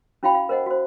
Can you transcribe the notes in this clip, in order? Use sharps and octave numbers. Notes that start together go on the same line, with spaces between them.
C#4 E4 F#4 F5 G5 B5
F5
A#4 C5 D#5 F#5
F#4 C5